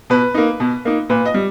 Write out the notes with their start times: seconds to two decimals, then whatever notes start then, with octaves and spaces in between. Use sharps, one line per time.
0.10 B2 B4
0.34 A#3 D#4
0.60 B2
0.85 A#3 D#4
1.10 A#2 B4
1.25 D#5
1.34 G3